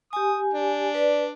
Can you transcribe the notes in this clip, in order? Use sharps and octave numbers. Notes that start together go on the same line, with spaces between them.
G4 G#5 D#6
D4
B4 D5